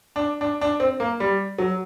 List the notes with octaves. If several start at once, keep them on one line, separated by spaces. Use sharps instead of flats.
D4
D4
D4
C4
A#3
G3
F#3